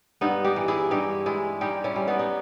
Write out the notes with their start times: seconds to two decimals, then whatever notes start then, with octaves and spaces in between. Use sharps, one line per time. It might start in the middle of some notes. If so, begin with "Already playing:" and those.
0.21 G2 B3 D#4
0.44 D#4 G4
0.56 E3
0.68 E4 G#4
0.91 G2 D#4 G4
1.26 G#3 E4 G#4
1.61 G3 D#4 G4
1.84 C#4 E4
1.96 G3
2.07 B3 D#4
2.19 D#4